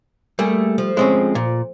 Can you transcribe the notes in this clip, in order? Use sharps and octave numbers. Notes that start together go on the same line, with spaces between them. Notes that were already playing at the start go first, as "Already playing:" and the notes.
G3 A3 A#3 G#4
F3
G#3 C4 C#4
A#2